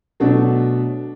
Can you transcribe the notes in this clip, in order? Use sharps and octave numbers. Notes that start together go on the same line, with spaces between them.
B2 F#3 A3 D4